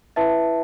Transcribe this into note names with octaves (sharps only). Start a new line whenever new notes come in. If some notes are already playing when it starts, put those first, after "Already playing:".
E4 B4 E5 A5